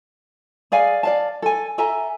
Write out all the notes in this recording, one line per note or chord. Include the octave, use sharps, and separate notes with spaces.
G#4 D5 F5 G#5
D5 F5 A5
A4 G#5
A4 E5 G#5 A#5